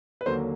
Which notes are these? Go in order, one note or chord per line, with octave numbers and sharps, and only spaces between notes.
B4
D#2 D3 F#3 A#3 C5